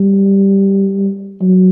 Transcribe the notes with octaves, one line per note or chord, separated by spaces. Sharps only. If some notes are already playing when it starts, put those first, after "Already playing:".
Already playing: G3
F#3